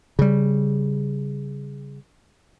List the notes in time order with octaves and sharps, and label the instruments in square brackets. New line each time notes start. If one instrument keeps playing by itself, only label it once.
[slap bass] C#3 G3